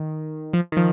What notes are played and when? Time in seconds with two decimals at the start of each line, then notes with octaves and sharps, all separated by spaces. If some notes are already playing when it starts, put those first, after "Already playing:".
Already playing: D#3
0.53 F3
0.72 D#3
0.77 F3